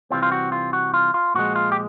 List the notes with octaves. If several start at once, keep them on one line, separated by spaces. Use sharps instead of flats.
C3 E3 G3 C4 F4
F4
F#4
F4
F#4
F4
F4
A#2 F3 G#3 F#4
F4
G4